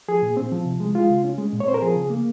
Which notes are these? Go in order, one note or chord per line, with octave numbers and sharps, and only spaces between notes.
F3 G#4
A#2
C4
F3
C3
G#3
G#3 F4
C#3
C#4
G#3
A#2
C#5
C4 C5
A#4
F3 G#4
C#3
A#3